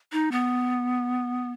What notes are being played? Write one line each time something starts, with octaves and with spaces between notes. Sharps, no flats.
D#4
B3